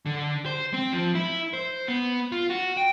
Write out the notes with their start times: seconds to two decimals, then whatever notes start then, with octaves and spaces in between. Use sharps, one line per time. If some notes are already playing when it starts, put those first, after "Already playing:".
0.06 D3
0.46 C5
0.74 C4
0.93 F3
1.15 E4
1.53 C5
1.88 B3
2.32 F4
2.50 F#4
2.77 G5